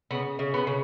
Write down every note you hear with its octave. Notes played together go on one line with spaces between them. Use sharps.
C#3 B3
C#3
B3
C#3